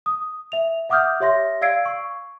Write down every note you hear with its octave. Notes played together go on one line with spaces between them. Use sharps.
D#6
E5 F7
E5 F#5 D6 D#6 F6 G6
G4 C#5 E5 C6 A#6
D5 F5 E6 G#6 C7 D7
C#6